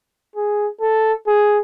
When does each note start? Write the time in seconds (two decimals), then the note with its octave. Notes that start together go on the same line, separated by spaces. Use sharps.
0.35 G#4
0.81 A4
1.27 G#4